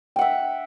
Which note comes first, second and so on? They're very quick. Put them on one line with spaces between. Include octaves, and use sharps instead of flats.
G5 F#5 E5